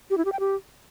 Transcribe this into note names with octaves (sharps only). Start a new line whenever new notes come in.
G4
E4
G4
G5
G4